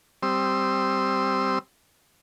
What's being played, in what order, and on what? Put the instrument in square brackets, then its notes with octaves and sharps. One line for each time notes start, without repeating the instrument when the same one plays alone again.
[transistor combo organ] G3 C4 C6 D#6 E6